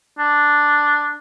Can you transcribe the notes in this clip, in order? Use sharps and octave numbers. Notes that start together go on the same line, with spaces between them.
D4